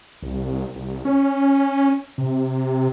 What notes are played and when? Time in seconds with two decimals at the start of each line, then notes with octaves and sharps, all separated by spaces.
0.22 C2
0.75 C2
1.05 C#4
2.18 C3